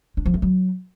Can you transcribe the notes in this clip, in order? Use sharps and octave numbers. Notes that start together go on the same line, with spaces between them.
D4
F3
A3
F#3